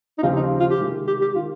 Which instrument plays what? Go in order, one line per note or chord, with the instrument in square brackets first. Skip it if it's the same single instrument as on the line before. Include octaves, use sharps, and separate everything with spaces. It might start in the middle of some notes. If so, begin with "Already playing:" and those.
[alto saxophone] D#4
[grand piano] D#2 C#3 F3 C4 G4 [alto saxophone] F4
[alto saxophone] D#4
F4
G4
[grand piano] C3 D#3 G#3
[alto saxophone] G4
G4
[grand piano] D#3 [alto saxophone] F4